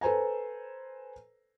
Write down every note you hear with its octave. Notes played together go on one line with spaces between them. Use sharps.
A4 B4 C5 G#5 A#5